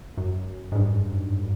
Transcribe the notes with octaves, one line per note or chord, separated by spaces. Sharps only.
F#2
G#2
G2